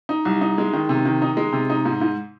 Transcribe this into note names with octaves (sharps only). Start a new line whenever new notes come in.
D#4
C2
D#4
G#3
D#3
C3
D#3
D#4
G#3
C3
D#4
G#2
G#2